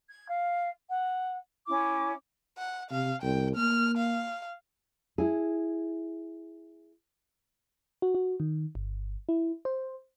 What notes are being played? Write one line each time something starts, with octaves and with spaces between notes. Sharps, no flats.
G#6
F5
F#5
C#4 E4 D6
F#5
C3 F5
C2 G5
A#3 F6
F5
E4 G#4
F#4
F#4
D#3
G1
E4
C5